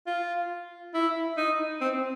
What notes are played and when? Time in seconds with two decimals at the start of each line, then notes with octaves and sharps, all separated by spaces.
0.07 F4
0.94 E4
1.37 D#4
1.81 C4